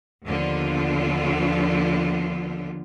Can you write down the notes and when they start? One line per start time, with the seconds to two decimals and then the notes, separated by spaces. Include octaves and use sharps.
0.25 D#2 D3 F3 B3 F4